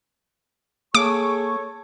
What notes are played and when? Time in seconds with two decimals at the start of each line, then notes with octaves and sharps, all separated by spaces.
0.95 A#3 G#4 A4 C#5 C#6 D6